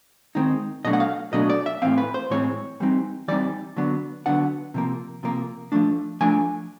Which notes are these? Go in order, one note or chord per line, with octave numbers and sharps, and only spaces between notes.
D#3 G#3 C4 D#4
B2 F#3 A3 D4 D#5
F#5
F5
B2 F#3 A3 D4 D#5
D5
E5
A2 E3 G#3 C4 F5
B4
C5
A2 E3 G#3 C4 C#5
E3 G3 C4 D#4
E3 G3 C4 D#4 D5
D3 F#3 B3 D4
D3 F#3 B3 D4 F#5
C3 F3 A#3
C3 F3 A#3
F3 A3 D4
F3 A3 D4 G#5